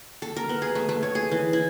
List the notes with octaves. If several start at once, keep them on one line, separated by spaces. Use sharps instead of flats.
A4
A#4
B3
G#4
A3
A3
C#5
G#4
E3
E4